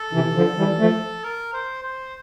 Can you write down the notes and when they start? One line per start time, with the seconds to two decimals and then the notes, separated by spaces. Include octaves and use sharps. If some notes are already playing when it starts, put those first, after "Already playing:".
Already playing: A4
0.13 C3 E3
0.35 D3 F3
0.57 E3 G3
0.79 F3 A3
1.24 A#4
1.53 C5
1.83 C5